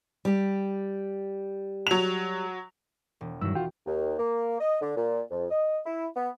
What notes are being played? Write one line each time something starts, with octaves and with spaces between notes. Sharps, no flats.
G3 G4
F#3 F7
E1
G2 D#3 F#3 E4 E6
F4 F#4 G5
D#2
A#3
D#5
D3
A#2
F2
D#5
E4
B3